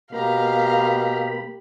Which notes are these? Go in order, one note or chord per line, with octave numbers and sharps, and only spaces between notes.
B2 A#3 G4 F5 A#5 B5